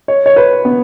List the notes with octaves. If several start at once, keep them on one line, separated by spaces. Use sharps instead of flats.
C#5
C#5
B4
B3